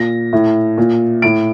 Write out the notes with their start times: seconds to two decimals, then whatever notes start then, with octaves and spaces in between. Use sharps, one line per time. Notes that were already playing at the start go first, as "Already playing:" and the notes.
Already playing: A#2 A#6
0.33 A2
0.78 A#2
1.22 A2 D7